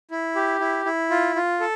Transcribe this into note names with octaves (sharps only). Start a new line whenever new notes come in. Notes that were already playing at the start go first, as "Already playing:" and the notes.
E4
G4
E4
E4
F4
F4
A4